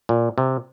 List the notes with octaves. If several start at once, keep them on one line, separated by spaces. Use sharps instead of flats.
A#2
C3